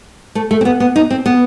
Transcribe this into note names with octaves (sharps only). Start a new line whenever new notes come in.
A3
A3
C4
B3
B3
D#4
C4
B3